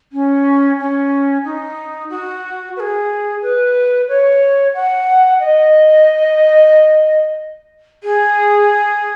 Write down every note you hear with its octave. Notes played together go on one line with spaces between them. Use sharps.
C#4
C#4
D#4
F#4
B4
G#4
B4
C#5
F#5
D#5
G#4